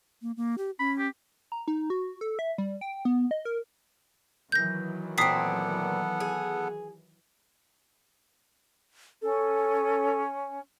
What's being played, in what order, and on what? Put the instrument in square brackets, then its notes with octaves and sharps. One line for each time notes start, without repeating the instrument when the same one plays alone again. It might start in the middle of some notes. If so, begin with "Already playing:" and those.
[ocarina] A#3
A#3
G4
[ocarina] C#4 [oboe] B5
[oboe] G4
[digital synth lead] A#5
D#4
F#4
A4
E5
G3
G5
B3
D#5
A#4
[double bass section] D#3 E3 F#3 [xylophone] G6 A#6
[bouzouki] A#2 C4 [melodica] B3 A4 F#5 [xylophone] D#6 B6 C7
[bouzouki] G#4
[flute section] C#4 [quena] A4